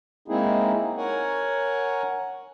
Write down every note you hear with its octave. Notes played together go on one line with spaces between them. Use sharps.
G#3 A#3 C4 D#4 E4 G#4
A#4 C#5 F#5 G#5